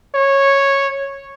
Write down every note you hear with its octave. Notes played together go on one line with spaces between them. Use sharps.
C#5